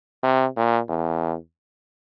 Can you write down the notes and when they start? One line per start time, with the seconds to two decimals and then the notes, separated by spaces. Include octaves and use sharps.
0.23 C3
0.56 A#2
0.89 E2